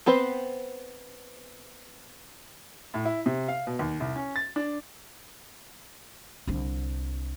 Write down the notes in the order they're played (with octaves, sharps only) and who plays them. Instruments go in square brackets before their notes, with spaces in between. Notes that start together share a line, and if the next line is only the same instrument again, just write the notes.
[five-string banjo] B3 C4 B4 C5
[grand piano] A2
E4
C3
F5
B2
D#2
C2
C#4
A6
D4
[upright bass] C2 D3